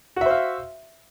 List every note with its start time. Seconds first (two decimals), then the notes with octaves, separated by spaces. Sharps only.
0.16 F#4
0.21 E5
0.26 C5
0.30 F5